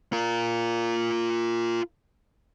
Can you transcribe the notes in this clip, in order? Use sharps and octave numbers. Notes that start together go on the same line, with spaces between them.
F4 A#4